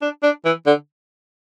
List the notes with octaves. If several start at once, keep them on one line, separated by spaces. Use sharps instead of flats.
D4
D4
E3
D3